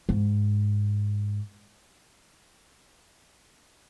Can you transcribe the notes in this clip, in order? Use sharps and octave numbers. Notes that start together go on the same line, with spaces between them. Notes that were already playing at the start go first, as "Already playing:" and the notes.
G#2